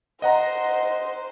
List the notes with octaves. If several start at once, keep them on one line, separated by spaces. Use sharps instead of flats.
C5 D#5 F#5 A#5